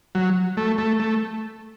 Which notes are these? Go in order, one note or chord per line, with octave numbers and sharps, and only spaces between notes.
F#3
A3
A3
A3